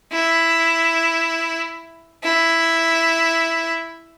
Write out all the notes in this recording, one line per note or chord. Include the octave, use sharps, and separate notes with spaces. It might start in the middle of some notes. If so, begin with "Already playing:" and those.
E4
E4